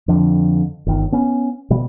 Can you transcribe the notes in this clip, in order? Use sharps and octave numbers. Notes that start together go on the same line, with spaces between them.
F2 D3
G1 D#3
B3 C#4
B2 G3